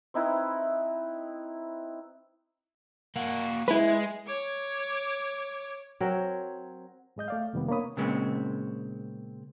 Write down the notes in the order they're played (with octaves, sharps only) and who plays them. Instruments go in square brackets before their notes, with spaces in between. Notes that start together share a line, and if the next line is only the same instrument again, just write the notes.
[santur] C4 D#4 E4 B4
[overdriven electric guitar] A#3 F#4
[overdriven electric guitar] G#3 [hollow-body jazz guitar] E4 B4
[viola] C#5 D6
[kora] F#3 C4 A#4 C#5
[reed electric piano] G#2 G#3 D#5 G6
A3 D5 F5
F2 C3 D#3 G3 A#3 B3
A#3 B3 D4 C#5 B5 D#6
[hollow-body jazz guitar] A#2 C#3 G#3 B3 C4